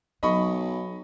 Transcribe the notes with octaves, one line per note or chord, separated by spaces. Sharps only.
B1 F#3 D#5 B5 C#6